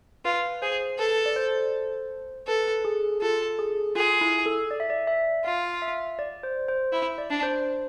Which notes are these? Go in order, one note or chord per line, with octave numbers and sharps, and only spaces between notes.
F4 B4
G#4 C5
A4 B4
D5
C5
A4 B4
G#4
F4 A4
G#4
F4 G#4
E4
A4
D5
E5
D5
E5
F4 F5
E5
D5
C5
C5
E4 E5
D5
D4
C5